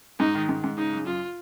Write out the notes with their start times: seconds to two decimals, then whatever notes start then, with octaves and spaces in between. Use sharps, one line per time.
0.19 G#2 D#4
0.35 D#3
0.49 G#2
0.64 G#2
0.78 C#3 D#4
0.93 F#2
1.07 F#2 F4